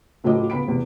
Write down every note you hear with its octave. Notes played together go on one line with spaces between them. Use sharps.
C#2 A2 F3 F#3 D#5 D6
C#2 B3 B5 B6 D7
E2 C3